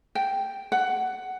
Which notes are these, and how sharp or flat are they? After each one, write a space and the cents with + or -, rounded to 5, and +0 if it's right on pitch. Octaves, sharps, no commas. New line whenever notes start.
G5 -5
F#5 +10